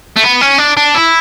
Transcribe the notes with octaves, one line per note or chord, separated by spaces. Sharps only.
A3
B3
C#4
D4
D4
E4